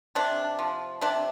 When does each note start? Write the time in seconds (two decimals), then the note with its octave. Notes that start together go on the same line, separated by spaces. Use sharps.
0.15 C3 D4
0.59 F3
1.01 C3 D4